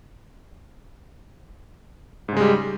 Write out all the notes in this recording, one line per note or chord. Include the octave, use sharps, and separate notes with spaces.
G#2 C#3 G3 G#3